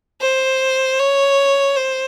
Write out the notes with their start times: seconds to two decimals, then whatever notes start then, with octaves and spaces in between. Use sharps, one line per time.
0.21 C5
0.99 C#5
1.76 C5